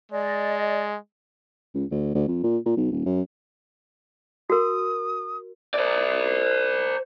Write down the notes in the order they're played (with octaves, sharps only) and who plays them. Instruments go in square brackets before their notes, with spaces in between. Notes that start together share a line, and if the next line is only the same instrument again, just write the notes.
[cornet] G#3 [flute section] D5 D#5
[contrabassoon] C#2
D2
D2
F2
A#2
A#2
B1
D#1
F#2
[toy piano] F#4 A#4 [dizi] D#6
[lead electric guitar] C5 D5